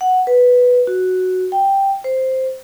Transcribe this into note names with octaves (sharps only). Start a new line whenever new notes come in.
F#5
B4
F#4
G5
C5